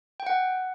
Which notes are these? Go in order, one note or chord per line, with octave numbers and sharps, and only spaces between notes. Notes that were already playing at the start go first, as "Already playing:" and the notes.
G5
F#5